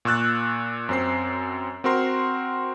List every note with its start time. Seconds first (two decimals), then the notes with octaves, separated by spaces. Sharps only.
0.05 A#2 C#6 E6 F#6 A6
0.89 F#2 C4 C7
1.84 C4 F#4 A#4 C6